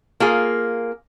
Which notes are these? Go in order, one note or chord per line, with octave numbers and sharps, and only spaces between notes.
A#3 F4 G#4